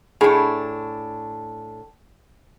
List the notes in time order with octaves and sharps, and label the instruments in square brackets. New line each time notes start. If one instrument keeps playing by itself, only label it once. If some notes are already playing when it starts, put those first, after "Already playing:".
[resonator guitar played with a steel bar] A2 D4 [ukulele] G#4